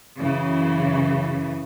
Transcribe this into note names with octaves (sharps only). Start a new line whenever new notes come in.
F#2 C#3 E3